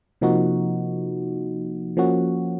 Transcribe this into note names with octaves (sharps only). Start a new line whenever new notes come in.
C3 F3 A#3 D#4 F#4
F3 A#3 C#4 F#4